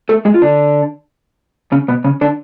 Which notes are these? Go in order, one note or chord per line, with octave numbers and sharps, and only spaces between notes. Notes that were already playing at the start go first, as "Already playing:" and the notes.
A3 A4
G#3 G#4
F4
D3 D4
C#3 C#4
B2 B3
C#3 C#4
D3 D4